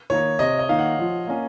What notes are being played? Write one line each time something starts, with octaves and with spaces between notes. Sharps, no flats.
D#3 A#3 D#4 C#5
C3 D#5
D#5
D#3 A#3 D#4 F5
F#5
F3
A#3 C#4